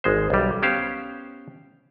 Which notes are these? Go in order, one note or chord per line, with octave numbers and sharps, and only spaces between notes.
G#1 G#3 C5
B1 G3
B3 C#4 G4 C5 F5